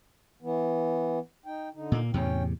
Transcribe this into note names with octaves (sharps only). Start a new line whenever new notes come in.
E3 B3
D#4 G5
D3 D#4
A#2 A#3
E2 A2 C3 C#4 G5